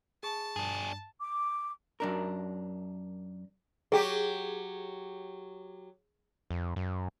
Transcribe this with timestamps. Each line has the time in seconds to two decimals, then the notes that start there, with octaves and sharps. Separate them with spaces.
0.23 G#4 A5 C#6
0.56 G2 D4 G#4
1.20 D6
2.00 F#2 D4 A#4
3.92 F#3 G4 G#4
6.50 F2
6.76 F#2